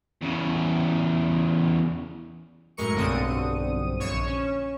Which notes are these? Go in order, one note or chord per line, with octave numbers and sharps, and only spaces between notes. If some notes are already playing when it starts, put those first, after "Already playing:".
E2 C#3
F#2 A2 G#3 A#4 C#6 C#7
B1 G2 D3 C4 D#6 D#7
A#1 C#5 C#6 E7
C#4